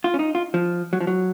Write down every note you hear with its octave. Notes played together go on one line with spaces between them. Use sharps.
F4
C#4
D#4
F4
F3
F#3
F3
F#3